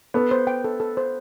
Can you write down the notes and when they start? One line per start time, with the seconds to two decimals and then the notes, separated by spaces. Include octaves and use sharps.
0.14 B3 A4
0.31 C5
0.47 G5
0.64 A4
0.80 A4
0.97 C5